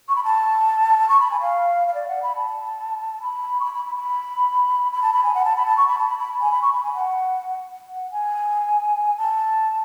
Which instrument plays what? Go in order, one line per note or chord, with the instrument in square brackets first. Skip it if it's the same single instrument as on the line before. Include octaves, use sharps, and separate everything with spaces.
[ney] C#6
B5
A5
C#6
B5
G#5
F5
F5
D5
F#5
B5
A5
B5
C#6
B5
B5
B5
B5
B5
A5
B5
G#5
F#5
A5
B5
A5
C#6
B5
A5
B5
B5
G#5
B5
C#6
B5
G#5
F#5
F#5
G#5
A5